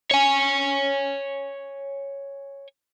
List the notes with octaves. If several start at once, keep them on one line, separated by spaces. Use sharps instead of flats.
C#5 G#5